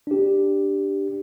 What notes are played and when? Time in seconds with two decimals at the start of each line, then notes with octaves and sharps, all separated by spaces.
0.07 D4 G4